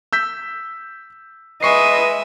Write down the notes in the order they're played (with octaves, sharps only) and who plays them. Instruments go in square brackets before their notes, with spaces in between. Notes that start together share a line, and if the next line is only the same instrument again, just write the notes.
[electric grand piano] E6 G6 B6
[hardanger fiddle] G#3 E5 [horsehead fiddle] B4 D#5 [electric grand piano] C#6 C7